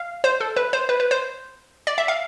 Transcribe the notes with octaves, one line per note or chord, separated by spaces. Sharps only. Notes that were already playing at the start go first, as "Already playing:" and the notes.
Already playing: F5
C5
A4
B4
C5
B4
B4
C5
D5
E5
F5